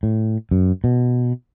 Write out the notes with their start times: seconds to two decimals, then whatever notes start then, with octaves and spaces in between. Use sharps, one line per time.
0.03 A2
0.51 F#2
0.84 B2